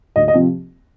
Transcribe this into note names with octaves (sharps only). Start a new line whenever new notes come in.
D2 D#5
D#5
C3 F3 C4